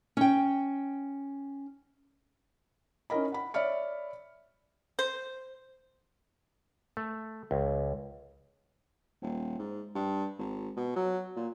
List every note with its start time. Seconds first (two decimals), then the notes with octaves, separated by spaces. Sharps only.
0.17 C#4 G5
3.10 C#4 D#4 E4 A#4 D#5 B5
3.32 F#5 B5
3.54 C#5 D5 E5 B5 F6 C#7
4.99 C5
6.97 A3
7.51 C#2
9.22 D#1
9.59 G#2
9.95 G2
10.38 G#1
10.76 B2
10.96 F#3
11.36 A#2